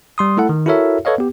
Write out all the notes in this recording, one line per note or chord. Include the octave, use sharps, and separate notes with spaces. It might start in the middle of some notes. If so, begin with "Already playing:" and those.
G3 C6 D#6
A3 E4 A4 F#5
D#3
E4 F#4 A4 A#4 C#5 E5
A4 B4 C#5 D#5 F5
B3 G4